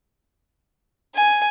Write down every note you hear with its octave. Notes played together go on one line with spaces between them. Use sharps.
G#5